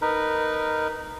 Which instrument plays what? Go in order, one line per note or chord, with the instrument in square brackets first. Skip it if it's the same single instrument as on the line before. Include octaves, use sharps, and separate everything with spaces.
[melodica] D#4 A#4 B4